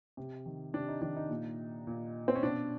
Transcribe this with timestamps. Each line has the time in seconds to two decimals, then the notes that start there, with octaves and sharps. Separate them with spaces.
0.17 C3
0.46 D#3
0.74 C3 D4
0.88 D#4
1.01 D#3 D4
1.16 D#4
1.30 A#2
1.87 A#2
2.28 C4
2.35 C#4
2.43 B2 D4